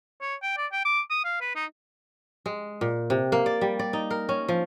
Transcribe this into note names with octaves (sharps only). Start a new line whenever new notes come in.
C#5
G5
D5
G5
D6
D#6
F5
B4
D#4
G#3
A#2
C3
A#3
D5
G3
D5
D#4
A#4
C#4
F3